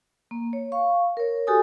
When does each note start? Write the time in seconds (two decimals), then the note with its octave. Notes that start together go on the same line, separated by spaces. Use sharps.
0.31 A#3
0.53 C#5
0.72 F5 C#6
1.17 A#4 C#5
1.47 F#4 G4 A4 G#5 D#6